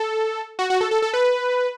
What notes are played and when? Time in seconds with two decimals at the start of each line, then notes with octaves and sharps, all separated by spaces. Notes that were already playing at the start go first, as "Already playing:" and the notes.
Already playing: A4
0.59 F#4
0.70 F#4
0.81 A4
0.91 A4
1.02 A4
1.14 B4